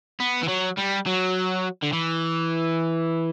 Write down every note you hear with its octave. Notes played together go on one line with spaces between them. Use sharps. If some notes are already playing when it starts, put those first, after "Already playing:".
B3
E3
F#3
G3
F#3
D3
E3